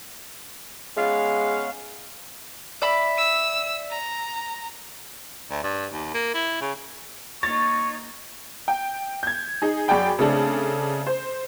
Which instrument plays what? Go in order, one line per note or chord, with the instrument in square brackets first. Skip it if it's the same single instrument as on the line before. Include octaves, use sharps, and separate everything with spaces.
[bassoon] G#3 [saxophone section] B3 C#4 F5
[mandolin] D5 E5 B5
[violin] E6
A#5
[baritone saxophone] D2
G2
D#2
A#3
E4
C#3
[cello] A#3 D#4 [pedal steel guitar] C#5 [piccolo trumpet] C#6 [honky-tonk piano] A6
[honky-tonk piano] G5
G6 G#6
D#4 G#4
F#2 F#4 G#4 D5 G5 B5
C#3 A3 C4 D4 A4
C5